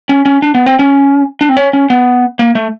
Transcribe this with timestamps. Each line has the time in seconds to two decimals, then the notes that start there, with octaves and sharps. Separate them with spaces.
0.09 C#4
0.26 C#4
0.42 D4
0.55 B3
0.66 C4
0.79 C#4
1.41 D4
1.49 C4
1.57 C#4
1.73 C#4
1.90 B3
2.39 A#3
2.55 A3